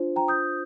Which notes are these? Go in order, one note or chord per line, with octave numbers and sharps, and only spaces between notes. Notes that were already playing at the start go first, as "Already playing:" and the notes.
Already playing: D4 F4 C5
G5 A#5
D#6 G6